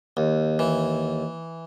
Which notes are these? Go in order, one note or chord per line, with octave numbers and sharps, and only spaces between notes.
D#2
E3